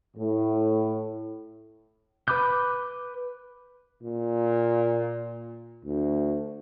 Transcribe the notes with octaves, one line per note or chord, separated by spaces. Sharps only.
A2
B4 B5 D6 F#6 G6
A#2
D2